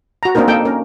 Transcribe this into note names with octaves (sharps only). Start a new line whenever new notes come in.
F#4 A#5
A#3 C4 D4 D#4 A#4
A#3 D#4 A4 G5
C#4 A#4